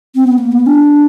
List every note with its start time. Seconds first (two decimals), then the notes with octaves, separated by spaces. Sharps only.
0.15 C4
0.27 B3
0.38 A#3
0.52 B3
0.67 D4